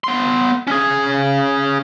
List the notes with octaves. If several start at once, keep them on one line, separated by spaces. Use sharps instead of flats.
B3 C6
C#4 G#4